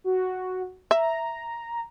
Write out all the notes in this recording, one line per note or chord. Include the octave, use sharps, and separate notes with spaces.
F#4
E5 A#5